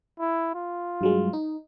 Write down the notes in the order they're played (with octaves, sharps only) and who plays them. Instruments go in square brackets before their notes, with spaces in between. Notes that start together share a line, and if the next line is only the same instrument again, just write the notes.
[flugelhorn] E4
F4
[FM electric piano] G2 F#3 G#3
D#4